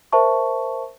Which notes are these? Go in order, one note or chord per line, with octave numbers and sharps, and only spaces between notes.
A#4 C5 E5 A5 C#6